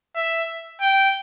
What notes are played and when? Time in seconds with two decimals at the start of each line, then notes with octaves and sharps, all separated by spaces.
0.16 E5
0.81 G5